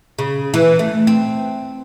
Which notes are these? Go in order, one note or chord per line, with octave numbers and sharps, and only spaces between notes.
C#3
E3
A3
C4